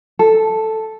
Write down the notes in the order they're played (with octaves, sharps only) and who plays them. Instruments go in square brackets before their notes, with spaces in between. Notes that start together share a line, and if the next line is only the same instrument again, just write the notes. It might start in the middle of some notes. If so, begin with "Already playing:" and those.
[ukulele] A4